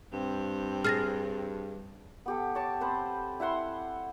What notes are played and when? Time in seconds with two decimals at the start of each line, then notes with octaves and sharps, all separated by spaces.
0.13 G2 C4
0.84 G#4 F6 A6 A#6
2.26 B3 G4 A4
2.55 C#5 A5 D6
2.81 C4 B4 C5 B5
3.40 E4 E5 F#5 C6